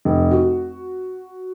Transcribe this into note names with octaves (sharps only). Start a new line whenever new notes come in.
F1
F#4